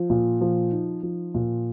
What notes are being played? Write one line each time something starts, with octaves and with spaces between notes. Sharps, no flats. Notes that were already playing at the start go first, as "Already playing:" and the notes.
Already playing: F3
A#2
F3
D#4
F3
A#2